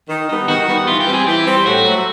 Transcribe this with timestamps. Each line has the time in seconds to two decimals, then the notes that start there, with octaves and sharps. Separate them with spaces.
0.09 D#3
0.29 G3 B3 D#4
0.48 D#3 F#4
0.67 G3 B3 D#4
0.87 E3 F4
1.00 G4
1.07 G3 C4
1.14 G#4
1.27 E3 G4
1.47 G3 C4
1.66 A2 F#4
1.85 F#3 A3